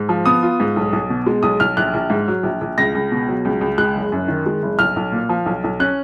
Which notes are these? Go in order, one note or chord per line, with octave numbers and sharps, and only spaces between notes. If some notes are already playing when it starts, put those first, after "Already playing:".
Already playing: G#2
F3
B3 D#6
F4
G#2
B1
B1
B2
G#3
B1 D#6
B1 F6
A#1 F#6
A#1
G#2
F#3
A#1
A#1
C#2 A#6
C#2
B2
F#3
C#2
C#2
G#3 F#6
F#1
F#2
D#3
G#3
F#1
B1 F6
B1
A#2
F3
B1
B1
C#4 F#6